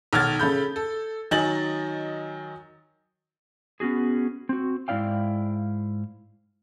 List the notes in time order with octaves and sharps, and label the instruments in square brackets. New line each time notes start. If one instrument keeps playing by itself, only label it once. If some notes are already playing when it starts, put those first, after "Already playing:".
[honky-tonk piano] B1 D#3 F6 G#6 A6
C#3 A4 B5 G6
A4
D#3 F#3 D#5 G#5 A6 F#7
[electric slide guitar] B3 C#4 F#4 G#4
C4 F#4
G#2 E3 E4 D5 F5 G5